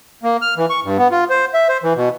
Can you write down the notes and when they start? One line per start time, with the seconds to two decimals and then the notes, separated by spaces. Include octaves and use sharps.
0.23 A#3
0.42 F6
0.57 E3
0.70 C#6
0.84 G2
0.98 B3
1.11 F4
1.30 C5
1.54 E5
1.69 C5
1.83 E3
1.96 B2